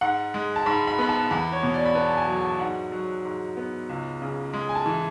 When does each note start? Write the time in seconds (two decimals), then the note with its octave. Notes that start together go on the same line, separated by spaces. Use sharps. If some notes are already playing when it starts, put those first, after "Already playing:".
0.01 G#2 F#5
0.34 G#3
0.56 A5
0.66 G#2 B5
0.87 B5
0.99 B3 B5
1.09 A5
1.31 E2 B5
1.52 C#5
1.63 B2
1.74 D5
1.85 B5
1.95 B3 A5
2.09 A5
2.17 G#5
2.28 F#3
2.39 A5
2.60 G#2 F#5
2.92 F#3
3.24 G#2
3.57 B3
3.89 C#2
4.22 C#3
4.53 G#3
4.69 G#5
4.75 A5
4.86 E3